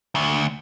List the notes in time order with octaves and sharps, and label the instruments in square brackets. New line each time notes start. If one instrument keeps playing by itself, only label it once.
[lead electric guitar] D2